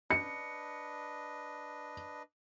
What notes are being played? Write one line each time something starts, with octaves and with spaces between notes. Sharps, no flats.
D4 B4 D#5 C#7